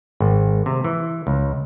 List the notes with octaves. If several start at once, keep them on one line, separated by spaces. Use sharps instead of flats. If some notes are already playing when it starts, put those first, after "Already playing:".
G#1
C3
E3
C#2